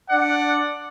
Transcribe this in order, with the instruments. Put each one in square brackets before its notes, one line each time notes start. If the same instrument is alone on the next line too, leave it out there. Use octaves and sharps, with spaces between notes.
[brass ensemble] D4 D5 F#5